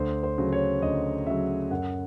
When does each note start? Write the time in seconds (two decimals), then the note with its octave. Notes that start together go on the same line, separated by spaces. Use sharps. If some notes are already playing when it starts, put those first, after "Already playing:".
Already playing: D2 C5
0.23 C5
0.38 C#3 F#3
0.53 C#5
0.82 D2 D#5
1.26 C#3 F#3 E5
1.71 F#2 F#5